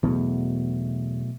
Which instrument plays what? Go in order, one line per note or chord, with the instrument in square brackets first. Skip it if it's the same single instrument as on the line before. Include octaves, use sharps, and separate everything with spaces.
[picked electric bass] E2 [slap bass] B2 F#3 A3